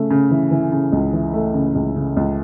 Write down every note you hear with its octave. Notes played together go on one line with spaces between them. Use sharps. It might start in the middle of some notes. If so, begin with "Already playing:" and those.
Already playing: C#3 A3
C#3
E3
E3
C#3
C#2
E3
A3
C#3
C#2
C#3
C#2